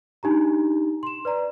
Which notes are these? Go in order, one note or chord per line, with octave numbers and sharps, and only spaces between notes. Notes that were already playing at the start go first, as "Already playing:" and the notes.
D4 D#4 G4 A#5
C6 E7
B4 D5 A#5